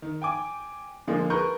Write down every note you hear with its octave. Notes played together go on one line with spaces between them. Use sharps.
D#3
G5 G#5 D6
D3 F3 G#3 A#3
G#4 A#4 B4 C#6 G6